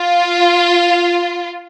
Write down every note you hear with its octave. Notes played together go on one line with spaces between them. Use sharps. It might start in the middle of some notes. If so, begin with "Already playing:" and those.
Already playing: F4